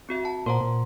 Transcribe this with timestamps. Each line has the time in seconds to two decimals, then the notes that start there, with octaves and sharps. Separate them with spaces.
0.09 C4 F#4 E5
0.24 F#5 A5
0.46 A#2 A#4 C5 F#5 A#5 C6
0.61 A#2